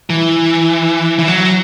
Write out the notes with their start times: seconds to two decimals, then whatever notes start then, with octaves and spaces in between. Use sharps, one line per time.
0.10 E3
1.19 E3
1.28 F#3